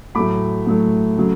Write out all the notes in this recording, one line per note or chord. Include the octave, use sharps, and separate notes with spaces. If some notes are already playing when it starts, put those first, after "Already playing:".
A2 F#3 A3 B5 D6
A2 F#3 A3
C#3 F#3 A3